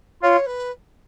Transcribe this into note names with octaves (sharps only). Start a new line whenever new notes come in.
F4 C#5
B4